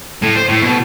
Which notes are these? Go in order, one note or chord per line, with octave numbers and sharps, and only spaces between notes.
A2
C5
A2
B2